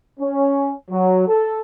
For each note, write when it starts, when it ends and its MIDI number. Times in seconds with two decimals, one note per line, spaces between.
0.19 0.72 61
0.90 1.24 54
1.27 1.59 69